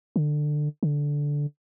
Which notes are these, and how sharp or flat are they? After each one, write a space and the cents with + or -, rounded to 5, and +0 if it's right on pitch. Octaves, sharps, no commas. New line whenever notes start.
D3 +20
D3 -10